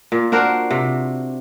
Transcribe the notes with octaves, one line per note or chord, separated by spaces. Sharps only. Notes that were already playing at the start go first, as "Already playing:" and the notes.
A#2
D4 F#4 A#4 C5
C3